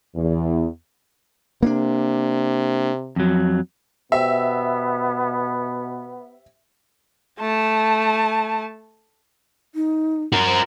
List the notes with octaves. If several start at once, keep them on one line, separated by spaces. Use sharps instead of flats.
E2
C3 A#3 C#4 D4
F2 F#3
B2 B3 G4 C5 E5 G5
A3 A5
D#4
F#4 A#4
C5